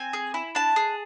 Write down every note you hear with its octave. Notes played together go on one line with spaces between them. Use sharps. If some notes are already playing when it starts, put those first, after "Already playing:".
Already playing: C4 G#5
G#4
E4
D4 A5
G#4